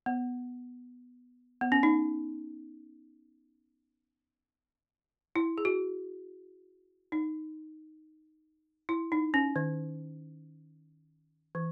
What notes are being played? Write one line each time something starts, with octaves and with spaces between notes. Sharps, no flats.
B3
B3
C#4
D#4
E4
G#4
F#4
D#4
E4
D#4
C#4
D#3
E3